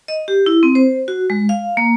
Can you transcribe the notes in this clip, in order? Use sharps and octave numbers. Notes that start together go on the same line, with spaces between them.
D#5
G4
E4
C4
C5
F#4
G#3
F5
A#3